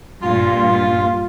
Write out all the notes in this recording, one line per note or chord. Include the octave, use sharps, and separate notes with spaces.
G2 A#2 F4